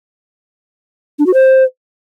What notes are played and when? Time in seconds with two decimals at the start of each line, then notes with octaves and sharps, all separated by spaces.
1.19 D4
1.26 F#4
1.34 C5